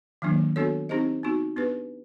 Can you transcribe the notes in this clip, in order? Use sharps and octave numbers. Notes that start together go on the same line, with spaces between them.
D#3 F#3 A#3 D4
B3 D4 F#4 A4 C#5
C4 D#4 G4 C5 D#5
B3 D#4 F#4
B3 D4 G4 B4